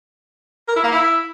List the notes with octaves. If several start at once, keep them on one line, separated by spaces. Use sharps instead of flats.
A#4
E4
A#3
E4